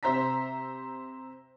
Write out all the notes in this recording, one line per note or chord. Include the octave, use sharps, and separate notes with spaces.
C3 C5 E5 A#5 B6